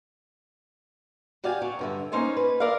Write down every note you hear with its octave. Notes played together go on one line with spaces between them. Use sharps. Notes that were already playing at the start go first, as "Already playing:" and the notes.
F#4 G4 D5 F5 G#5
F#3
G2 D3 E5
A#3 C#4 D#4 C5 C#5 G#5
B4
A#4 D5 E5 F5